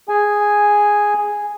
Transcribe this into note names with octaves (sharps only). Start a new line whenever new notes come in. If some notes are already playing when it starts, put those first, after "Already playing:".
G#4 G#5